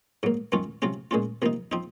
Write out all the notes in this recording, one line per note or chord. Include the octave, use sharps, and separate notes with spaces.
G#2 F#3 A#3
F#2 D#3 F#3 C#4 F4
C3 F#3 C#4 F4
A#2 G#3 C#4 F4
C3 F3 A#3 D#4
F3 C4 D#4